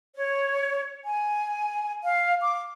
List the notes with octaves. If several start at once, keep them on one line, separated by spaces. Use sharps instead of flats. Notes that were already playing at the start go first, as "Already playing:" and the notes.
C#5
G#5
F5
D6